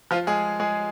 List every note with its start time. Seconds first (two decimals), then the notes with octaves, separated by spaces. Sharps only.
0.11 F3 F4
0.27 G#3 G#4
0.60 G#3 G#4